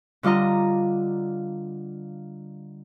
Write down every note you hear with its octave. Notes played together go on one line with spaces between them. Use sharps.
D3 G3 F4 D#5 A#5